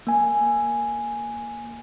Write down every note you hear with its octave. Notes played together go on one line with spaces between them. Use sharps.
A#3 G#5